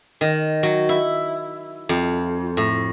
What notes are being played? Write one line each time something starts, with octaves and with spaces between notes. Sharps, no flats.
D#3
F#3
E4
F2
A2